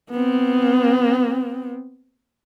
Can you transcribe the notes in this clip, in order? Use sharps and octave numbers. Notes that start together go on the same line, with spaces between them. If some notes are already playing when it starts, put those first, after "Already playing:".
B3 C4